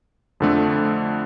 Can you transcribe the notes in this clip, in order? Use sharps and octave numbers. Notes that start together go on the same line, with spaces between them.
F2 D3 A3